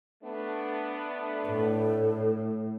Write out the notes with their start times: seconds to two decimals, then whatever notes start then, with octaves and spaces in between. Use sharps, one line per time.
0.23 A3 B3 D4
1.45 A2 A4